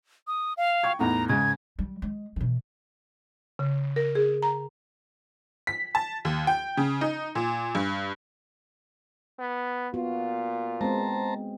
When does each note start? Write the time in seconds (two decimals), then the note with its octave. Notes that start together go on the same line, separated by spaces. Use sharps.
0.27 D#6
0.57 F5
0.83 G5 C#6 G#6
0.99 E2 A2 D#4 A#5
1.29 G#2 C#3 G#3 G#6
1.79 G3
2.02 G#3
2.36 B2 E3
3.59 C#3
3.96 A#4
4.15 G#4
4.43 A#5
5.67 B6
5.95 A5
6.25 D#2
6.47 G5
6.77 C#3
7.01 D#4
7.35 A#2
7.75 G2
9.39 B3
9.94 A#2 B3 F4 F#4
10.81 G#3 B3 C4 C5 A5 A#5